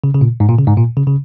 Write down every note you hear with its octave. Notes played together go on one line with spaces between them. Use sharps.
C#3
C#3
A#2
G#2
A#2
C#3
G#2
A#2
C#3
C#3